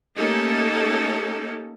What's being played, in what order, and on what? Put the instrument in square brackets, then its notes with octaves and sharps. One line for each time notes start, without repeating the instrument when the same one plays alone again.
[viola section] A3 A#3 C#4 D#4 G4 A4